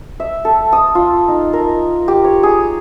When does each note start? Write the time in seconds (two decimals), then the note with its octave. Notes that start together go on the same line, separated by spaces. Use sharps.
0.20 E5
0.45 A4
0.72 D#6
0.95 F4
1.28 D#4
1.53 A#4
2.08 G4
2.24 C#5
2.43 G#4